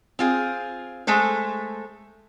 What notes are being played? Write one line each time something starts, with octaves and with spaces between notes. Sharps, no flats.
C4 F4 G#4
G#3 A3 A4 C5